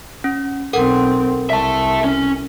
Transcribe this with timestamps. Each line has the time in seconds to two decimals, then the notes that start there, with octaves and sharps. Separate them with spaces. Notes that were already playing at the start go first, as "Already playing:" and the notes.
0.24 C#4
0.73 B1 C4 A4 A#4 F#5
1.50 C2 E5 A5
2.04 C#4